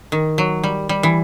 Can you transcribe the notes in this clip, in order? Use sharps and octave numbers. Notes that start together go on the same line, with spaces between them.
D#3
F#3
G3
G3
E3